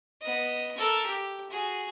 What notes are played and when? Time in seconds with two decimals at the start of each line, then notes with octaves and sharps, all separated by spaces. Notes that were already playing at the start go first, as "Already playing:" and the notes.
0.21 B3 D#5
0.77 A4 A#4
1.06 G4
1.50 F#4 G#4